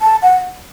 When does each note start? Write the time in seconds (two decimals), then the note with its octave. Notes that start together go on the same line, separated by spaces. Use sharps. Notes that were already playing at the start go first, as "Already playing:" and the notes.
0.02 A5
0.22 F#5